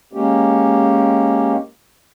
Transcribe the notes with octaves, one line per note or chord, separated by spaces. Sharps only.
G#3 A#3 C#4 G4